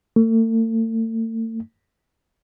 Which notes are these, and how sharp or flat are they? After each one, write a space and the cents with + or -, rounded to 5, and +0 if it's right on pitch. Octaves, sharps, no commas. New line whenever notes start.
A3 +40